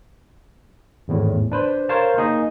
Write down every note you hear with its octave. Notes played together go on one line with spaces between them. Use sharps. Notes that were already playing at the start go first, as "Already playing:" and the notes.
G#1 E2 A2
D4 B4 C5
A#4 C5 C#5 F5 A5
A#3 D#4 G#4 D#5